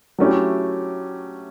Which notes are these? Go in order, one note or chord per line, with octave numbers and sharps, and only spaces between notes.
F#3 A3 C#4 E4 G4